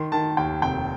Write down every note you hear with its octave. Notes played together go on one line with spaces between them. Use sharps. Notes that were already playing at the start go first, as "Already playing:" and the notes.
Already playing: D#3 C6
D#3 A5
D#2 G5
F1 G5